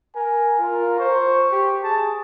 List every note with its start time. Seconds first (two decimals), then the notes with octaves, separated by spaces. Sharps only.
0.15 A#4 G#5
0.59 F4 A#4
0.99 C5 C#6
1.52 G4
1.83 G#4 A5